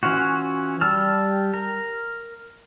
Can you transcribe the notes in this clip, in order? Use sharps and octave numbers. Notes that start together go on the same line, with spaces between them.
E3 C#4 F4 F#4
G3 A5 E6 F6
A#4